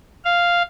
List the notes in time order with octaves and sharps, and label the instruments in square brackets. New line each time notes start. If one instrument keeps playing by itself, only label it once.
[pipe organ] F5